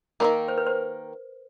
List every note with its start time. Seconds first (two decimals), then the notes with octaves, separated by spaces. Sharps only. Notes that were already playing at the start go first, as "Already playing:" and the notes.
0.20 D#3 G3 A#3 A#4
0.48 C5
0.58 B4
0.67 C5